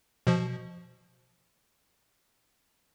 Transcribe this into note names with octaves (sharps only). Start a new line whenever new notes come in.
B2 F3